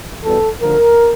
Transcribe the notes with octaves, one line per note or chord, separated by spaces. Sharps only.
E2 B2 G3 B3 A4
D2 D3 F3 A#4